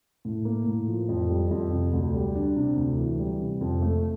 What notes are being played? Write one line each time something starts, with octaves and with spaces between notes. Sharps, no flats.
A2
A#3
A2
F3
F2
G3
F2
C3
D2
G3
D4
C3
D2
E3
G3
C3
F2
A3